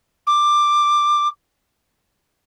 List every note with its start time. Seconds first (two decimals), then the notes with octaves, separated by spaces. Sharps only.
0.27 D6